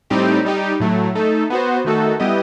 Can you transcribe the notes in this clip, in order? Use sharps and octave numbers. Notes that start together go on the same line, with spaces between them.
A2 G3 C4 D#4 G4
G3 D#4 G4
A2 F#3 A3
A3 D#4 A4
B3 F#4 C5
D#3 A3 D#4 F#4 A4
G3 B3 E4 G4 D#5